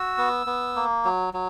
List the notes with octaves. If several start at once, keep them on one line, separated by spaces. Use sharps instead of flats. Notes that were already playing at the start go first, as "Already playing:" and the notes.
Already playing: F#4 E6
B3
B3
A#3
F#3
F#3